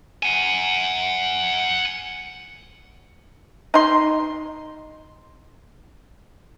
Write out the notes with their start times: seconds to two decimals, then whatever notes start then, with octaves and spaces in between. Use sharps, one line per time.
0.23 F#5 G#5
3.74 D#4 C6